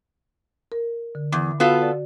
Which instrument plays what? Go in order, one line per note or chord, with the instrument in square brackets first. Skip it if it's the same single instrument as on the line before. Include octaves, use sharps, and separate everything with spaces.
[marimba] A#4
D3
[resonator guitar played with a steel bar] E2 [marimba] D6
[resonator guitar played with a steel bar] B3 F4 A4 [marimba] F#4
[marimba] D5